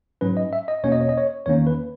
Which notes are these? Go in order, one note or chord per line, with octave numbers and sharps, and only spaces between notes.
G#2 F#3 C#4 B4
D#5
E5
D#5
E2 B2 A#3 C#4 C#5
D#5
C#5
D#5
C#5
E2 D#3 A#3 C#4 C#5
B4